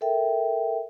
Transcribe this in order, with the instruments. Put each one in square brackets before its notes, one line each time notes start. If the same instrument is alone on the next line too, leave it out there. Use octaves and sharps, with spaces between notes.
[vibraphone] A4 A#4 E5 G5